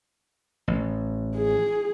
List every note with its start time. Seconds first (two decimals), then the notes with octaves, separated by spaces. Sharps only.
0.68 A1
1.37 G#4